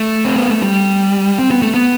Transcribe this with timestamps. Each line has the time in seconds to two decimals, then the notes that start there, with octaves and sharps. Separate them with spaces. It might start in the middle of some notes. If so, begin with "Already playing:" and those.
Already playing: A3
0.25 C4
0.37 B3
0.50 A3
0.63 G3
1.39 C4
1.51 B3
1.62 A3
1.74 B3